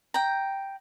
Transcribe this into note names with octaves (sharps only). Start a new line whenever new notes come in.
G5 A#5